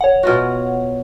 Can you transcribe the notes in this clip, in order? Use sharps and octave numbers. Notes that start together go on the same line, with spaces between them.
C#5 F#5
B2 F4 F#4